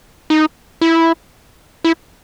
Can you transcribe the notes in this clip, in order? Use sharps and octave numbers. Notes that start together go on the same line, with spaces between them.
D#4
E4
E4